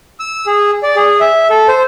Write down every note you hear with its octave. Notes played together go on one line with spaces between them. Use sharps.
E6
G#4
D5
G#4
E5
A4
C5